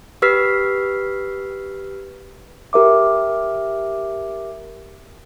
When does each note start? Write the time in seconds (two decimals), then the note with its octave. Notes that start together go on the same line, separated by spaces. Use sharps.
0.22 G4 B4 E6 F6 B6 C7
2.73 G4 A#4 E5 D6